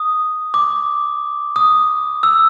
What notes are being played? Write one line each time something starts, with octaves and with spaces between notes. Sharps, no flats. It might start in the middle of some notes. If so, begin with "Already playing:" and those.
Already playing: D#6
D6
D#6
E6